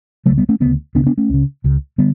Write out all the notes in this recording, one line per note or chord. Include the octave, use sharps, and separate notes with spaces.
C#2 C#3 F#3 A3
G3 B3
A3 C#4
D2 C#3 G3 B3
D2 C#3 B3 D4
B3 D4
A3 C#4
C#2 C#3
C#2 C#3
D3 G3 B3